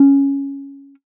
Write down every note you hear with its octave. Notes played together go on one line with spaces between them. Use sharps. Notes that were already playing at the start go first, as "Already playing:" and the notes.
Already playing: C#4